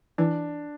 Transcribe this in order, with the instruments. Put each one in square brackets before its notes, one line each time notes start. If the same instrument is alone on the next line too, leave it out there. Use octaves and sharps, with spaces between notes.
[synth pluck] E3 [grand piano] D4